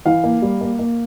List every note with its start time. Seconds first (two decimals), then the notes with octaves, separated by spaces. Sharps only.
0.06 E3 F5
0.24 A#3
0.42 G3
0.61 A#3
0.79 A#3